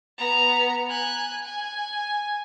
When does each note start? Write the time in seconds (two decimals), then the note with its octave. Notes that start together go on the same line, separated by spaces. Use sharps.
0.18 B3 A#5
0.89 G#5 F#6
1.45 G#5